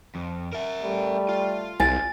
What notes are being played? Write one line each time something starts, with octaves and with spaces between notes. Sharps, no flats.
F2
A#4 E5
G3 A3
F4
C2 G#5 A6